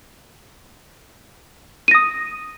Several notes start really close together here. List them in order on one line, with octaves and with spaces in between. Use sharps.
D#7 A#6 D#6